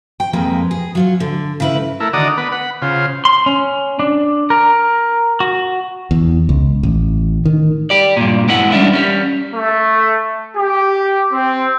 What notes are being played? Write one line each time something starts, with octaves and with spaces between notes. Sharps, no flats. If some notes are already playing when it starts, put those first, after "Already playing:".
G5
F2 G#3 A#3 B4
G#4
F#3 F4 C#5
D3
C#3 E4 B4
A3 E4 A#4
D3 D#3 F#4 D5 A#5 D#6
B3 B4
F#5 B5
C#3 F4 C5
C6
C#4
D4
A#4
F#4
E2
C#2
A1
D#3
G4 D5
G2 A#2
G#3 B3 E4 F#5
G3 C#4 D4 E4
G3 C#4
A3
G4
C4